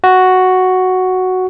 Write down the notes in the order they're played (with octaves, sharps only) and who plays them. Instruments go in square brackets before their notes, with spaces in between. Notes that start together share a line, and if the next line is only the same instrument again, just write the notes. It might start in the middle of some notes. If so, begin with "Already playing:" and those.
[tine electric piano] F#4